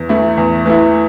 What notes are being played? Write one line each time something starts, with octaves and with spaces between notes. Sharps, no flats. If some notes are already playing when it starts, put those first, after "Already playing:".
Already playing: E2
E3 A3 E4
E2
E3 A3 E4